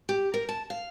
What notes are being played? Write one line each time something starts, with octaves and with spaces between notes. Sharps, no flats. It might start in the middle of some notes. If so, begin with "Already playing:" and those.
G4
A#4
A5
F5